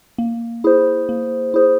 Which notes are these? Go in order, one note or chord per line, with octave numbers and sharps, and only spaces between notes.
A#3
E4 G#4 C5
A#3
E4 G#4 C5